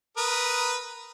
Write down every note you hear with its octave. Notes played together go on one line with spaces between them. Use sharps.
A#4 B4 D#6